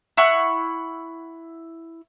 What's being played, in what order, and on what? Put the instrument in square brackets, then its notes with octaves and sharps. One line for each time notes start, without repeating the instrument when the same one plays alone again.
[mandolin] E4 F#5 C#6